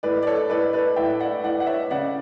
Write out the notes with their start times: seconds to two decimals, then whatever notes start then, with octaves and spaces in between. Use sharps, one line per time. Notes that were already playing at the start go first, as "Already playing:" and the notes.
0.03 A2 B4 D5
0.23 D5
0.27 A4 C#5
0.50 A2 B4 D5
0.73 B4 D5
0.96 A2 E5 G5
1.20 D5 F#5
1.44 A2 D5 F#5
1.60 F#5
1.66 C#5 E5
1.90 C#3 D5 F#5